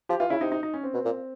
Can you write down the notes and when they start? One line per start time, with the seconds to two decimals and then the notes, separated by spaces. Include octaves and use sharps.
0.09 F3 G4
0.20 E3 F4
0.30 C#3 E4
0.41 C3 D#4
0.52 D#4
0.63 D#4
0.74 C#4
0.84 C4
0.94 B2
1.05 A#2